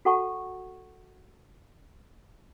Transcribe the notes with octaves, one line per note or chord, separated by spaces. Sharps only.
F#4 A4 F#5 A5 C#6